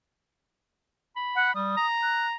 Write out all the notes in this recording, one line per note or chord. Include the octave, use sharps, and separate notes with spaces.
B5
F#5
G3 D#6
A#5
F#6